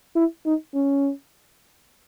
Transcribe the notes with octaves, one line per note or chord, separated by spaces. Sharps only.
E4
D#4
C#4